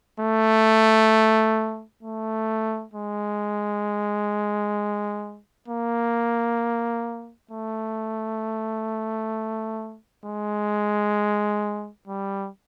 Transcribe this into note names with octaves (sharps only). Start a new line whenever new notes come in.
A3
A3
G#3
A#3
A3
G#3
G3